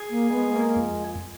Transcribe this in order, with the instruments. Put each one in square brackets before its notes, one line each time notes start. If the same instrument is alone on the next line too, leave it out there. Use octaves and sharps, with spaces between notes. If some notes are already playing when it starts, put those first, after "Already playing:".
Already playing: [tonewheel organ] G#4
[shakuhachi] A#3
[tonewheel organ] G#3 [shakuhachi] B3
[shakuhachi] A#3
[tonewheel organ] F2